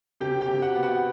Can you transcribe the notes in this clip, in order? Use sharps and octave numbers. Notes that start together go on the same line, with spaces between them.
C3 G4 G5
G4 G5
C3
F#4 F#5
B3
F#4 F#5